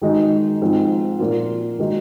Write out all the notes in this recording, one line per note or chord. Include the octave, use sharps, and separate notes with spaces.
D#3 G#3 D#4 F#4
G#2 F3 G#3 C4
A#2 F3 A#3 F4
D#3 G#3 D#4 F#4